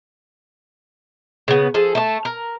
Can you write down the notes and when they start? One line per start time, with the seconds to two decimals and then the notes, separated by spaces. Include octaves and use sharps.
1.48 C#3 B3
1.74 F3 G#4 A4
1.95 A3 A5
2.25 A#4